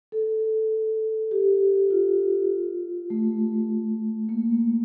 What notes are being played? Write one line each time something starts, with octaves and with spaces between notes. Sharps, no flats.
A4
G4
F4
A3
A#3